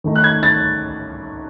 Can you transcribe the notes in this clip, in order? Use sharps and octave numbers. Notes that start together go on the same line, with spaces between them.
D#3 A3 D#4
F#6
G#6
A6